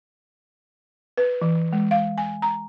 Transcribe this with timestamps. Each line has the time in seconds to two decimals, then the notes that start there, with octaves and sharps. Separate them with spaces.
1.18 B4
1.42 E3
1.73 G#3
1.91 F5
2.18 G#5
2.42 A#5